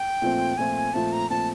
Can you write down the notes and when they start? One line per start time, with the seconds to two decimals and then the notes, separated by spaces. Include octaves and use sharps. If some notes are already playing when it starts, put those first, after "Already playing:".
Already playing: G5
0.22 A#2 F3 A3 C4
0.57 A#2 F3 A3 C4 G#5
0.93 A#2 F3 A3 C4 A5
1.12 A#5
1.30 A#2 F3 A3 C4 A5